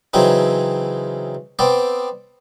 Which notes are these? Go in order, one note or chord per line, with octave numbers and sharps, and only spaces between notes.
C#3 E3 F#3 C4 C#4 D#4
B3 C4 D5